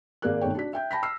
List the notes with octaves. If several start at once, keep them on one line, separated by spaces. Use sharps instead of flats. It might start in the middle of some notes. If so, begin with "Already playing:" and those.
G#1 A#3 G#4 A#4 D5 F#6
G#1 B2 A3 D#4 C#5 G5
D4 F#4 B6
E5 G5 G6
G5 A5 B5 A#6 B6
E6 F6 C7